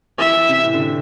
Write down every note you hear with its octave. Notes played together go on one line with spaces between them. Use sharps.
E3 E5
E3
C3
A2
D3
C3